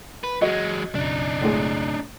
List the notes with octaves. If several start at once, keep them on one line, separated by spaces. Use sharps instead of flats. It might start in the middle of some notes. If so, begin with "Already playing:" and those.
B4
F#3 G#3 F#4 D#5
F#1 B1 C#3 D4 D#4
A2 G#3 G#4